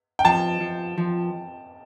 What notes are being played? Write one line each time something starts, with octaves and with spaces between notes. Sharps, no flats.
G5
F3 A5
F3
F3